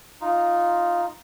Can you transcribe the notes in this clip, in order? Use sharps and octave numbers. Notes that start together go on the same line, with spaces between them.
D#4 F4